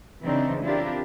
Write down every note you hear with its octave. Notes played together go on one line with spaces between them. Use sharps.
C#3 E3 F#3 C4 D4 D#4
C4 D4 E4 F4 G4 A#4